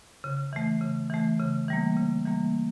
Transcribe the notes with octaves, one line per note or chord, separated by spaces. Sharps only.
C#3
E3 A3
C#3
E3 A3
C#3
E3 G3 A#3
C#3
E3 G3 A#3